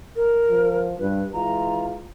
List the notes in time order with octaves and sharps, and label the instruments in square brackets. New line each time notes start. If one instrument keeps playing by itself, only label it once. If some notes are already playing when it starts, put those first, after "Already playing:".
[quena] A#4
[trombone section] F3
[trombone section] G2 [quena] B4
[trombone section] E3 G#3 F4 [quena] A#5